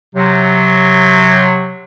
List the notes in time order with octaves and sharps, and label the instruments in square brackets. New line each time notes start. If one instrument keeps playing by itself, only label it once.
[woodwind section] C3 F#3